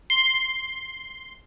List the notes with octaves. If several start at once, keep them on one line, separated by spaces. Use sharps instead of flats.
C6